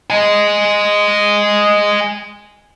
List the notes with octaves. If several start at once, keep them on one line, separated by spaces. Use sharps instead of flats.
D#5 G#5